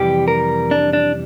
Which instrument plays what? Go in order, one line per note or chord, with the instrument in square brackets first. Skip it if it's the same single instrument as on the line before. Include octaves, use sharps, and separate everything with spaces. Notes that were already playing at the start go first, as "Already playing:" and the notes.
Already playing: [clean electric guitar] F2 C3 E3 G3 G4
A#4
D4
D4